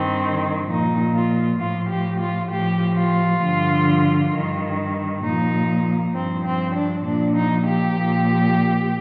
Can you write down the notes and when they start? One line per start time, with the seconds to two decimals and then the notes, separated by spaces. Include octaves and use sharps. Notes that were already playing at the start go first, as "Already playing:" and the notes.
Already playing: G2 D#3 C4
0.68 A#2 F3 D#4
1.13 F4
1.59 A2 F3 F4
1.89 G4
2.20 F4
2.50 A2 F3 G4
2.96 F4
3.41 G2 D3 F3
4.32 G2 D#3
5.23 A#2 F3 D#4
6.14 G2 F3 C4
6.44 C4
6.75 D4
7.05 A#2 F3 D4
7.35 D#4
7.66 G4
7.96 A#2 F3